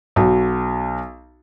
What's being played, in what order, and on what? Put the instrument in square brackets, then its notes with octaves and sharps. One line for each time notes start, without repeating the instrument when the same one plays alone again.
[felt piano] B1 F#4